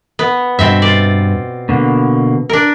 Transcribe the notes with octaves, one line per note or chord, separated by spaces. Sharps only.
B3
G2 B2 C4 E5
F4 D5
B2 D3 A#3
D4 A#4